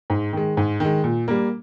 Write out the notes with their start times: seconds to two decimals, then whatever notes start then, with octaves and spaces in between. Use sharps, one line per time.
0.10 G#2
0.33 D#3 G#3
0.57 G#2
0.80 D#3 G#3
1.04 A#2
1.28 G3 A#3